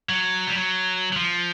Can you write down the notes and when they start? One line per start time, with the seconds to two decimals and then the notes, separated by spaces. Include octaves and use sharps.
0.09 F#3
0.47 G3
0.55 F#3
1.12 F#3
1.16 F3